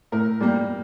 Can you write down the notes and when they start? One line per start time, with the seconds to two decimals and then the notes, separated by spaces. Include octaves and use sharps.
0.12 A2 A#4
0.41 G3 A#3